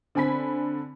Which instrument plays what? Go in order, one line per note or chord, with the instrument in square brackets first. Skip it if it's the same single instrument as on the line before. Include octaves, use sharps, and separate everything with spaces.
[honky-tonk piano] D3 C4 G#5 B5 B6